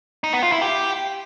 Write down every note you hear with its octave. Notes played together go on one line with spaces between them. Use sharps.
D#4
B3
F4
E4
G4